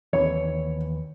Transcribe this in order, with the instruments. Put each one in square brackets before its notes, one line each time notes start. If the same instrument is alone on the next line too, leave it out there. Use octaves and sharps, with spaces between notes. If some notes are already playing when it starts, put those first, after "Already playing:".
[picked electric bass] D#2 E3 [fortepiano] C#5